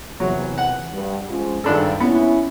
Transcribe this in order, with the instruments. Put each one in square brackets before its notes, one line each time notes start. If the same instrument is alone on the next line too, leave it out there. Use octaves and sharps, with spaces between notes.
[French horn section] E2 C3 E3 [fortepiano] F#3
[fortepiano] F#5
[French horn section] G2
F3 G#3 C#4
[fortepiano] G#1 D4 A4 [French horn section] G2
[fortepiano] B3 [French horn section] C#4 E4